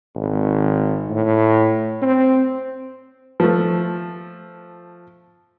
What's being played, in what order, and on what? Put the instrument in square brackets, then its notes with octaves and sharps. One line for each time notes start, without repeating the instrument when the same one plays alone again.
[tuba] G#1
A2
C4
[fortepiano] F3 A3